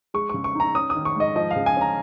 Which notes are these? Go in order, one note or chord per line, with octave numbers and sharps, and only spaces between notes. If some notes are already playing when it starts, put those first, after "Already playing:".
G#3 C#6
C#3 C#6
C#6
D#4 A#5
C#4 D#6
D#3 D#6
C#6
G#2 D#5
F3 D#5
F5
C#3
G#5
C#4 A#5